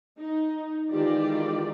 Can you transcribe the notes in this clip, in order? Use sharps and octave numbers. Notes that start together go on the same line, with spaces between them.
D#4
D#3 E3 G#3 F4 G4 D5